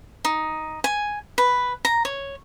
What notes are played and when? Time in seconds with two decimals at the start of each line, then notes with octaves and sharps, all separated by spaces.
0.25 D#4
0.84 G#5
1.38 B4
1.85 A#5
2.05 C#5